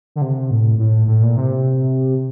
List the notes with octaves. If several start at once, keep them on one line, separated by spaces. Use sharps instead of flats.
D3
C3
A2
A2
A2
A#2
C3